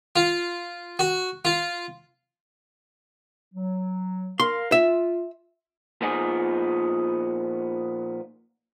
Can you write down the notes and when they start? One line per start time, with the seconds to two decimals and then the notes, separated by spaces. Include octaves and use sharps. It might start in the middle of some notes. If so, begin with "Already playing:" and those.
0.16 F4
0.99 F#4
1.45 F4
3.54 F#3
4.40 A#4 F5 C6
4.72 F4 E5
6.02 A#2 F3 B3 D#4 G#4